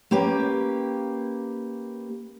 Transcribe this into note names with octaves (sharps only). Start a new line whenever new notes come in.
A#3 C#4 G4 B4